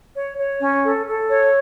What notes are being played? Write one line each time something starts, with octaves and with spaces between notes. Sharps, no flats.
C#5
C#5
C#4
A4
A4
C#5